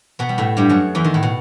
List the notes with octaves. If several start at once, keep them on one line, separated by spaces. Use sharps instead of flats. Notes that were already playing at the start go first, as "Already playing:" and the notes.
B2 B3
G3
A2 A3
G2 G3
F#2 F#3
E2 E3
D#3
A2
B2